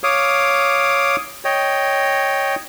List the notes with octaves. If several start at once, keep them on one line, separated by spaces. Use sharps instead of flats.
C#5 F5 D6 D#6
C#5 D#5 G5